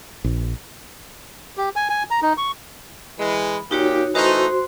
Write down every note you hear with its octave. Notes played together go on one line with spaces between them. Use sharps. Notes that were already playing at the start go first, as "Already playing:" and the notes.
A#1
G4
G#5
G#5
A#5
D#4
C#6
E3 G#3 B5
A#2 D#4 F#4 G4 C#5
E3 A3 D#4 F#4 C5 C6